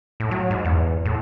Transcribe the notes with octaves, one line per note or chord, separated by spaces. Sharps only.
A2
F#3
G#2
E2
A2